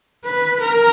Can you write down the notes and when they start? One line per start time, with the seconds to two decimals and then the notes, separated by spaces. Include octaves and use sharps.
0.25 B4
0.61 A#4